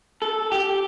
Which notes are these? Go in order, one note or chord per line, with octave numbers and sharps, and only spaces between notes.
A4
G4